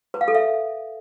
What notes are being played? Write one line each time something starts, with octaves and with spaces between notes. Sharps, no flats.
B4
F5
A4
E5